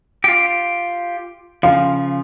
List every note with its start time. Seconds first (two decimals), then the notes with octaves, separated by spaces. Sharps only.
0.24 F4 G4
1.63 C#3 F3 F5